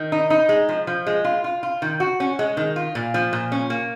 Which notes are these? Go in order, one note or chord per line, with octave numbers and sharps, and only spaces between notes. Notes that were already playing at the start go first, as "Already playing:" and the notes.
Already playing: D#3
D#4
D#4
G#3
F3
F3
G#3
F4
F4
F4
D#3
F#4
C#4
G#3
D#3
F4
A#2
F3
A#2
C#4
A#3